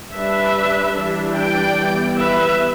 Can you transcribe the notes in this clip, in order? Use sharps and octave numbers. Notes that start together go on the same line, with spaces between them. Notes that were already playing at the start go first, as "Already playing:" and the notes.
G3 D4 B4 E5
E3 G3 D4
D5 G5
E3 G3 B3
B4 E5